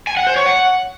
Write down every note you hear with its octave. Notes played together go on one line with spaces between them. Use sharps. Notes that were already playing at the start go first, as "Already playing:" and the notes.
G#5
F#5
C5
C#5
F#5